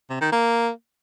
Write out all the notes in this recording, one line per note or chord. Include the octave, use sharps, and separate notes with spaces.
C3
D#3
A#3